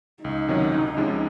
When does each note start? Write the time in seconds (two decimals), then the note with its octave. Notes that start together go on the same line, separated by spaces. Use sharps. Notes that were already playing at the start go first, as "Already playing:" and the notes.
0.24 C#2 D#4
0.48 C3 D#3 F#3 C#4
0.73 C2
0.97 C3 F3 G#3 C#4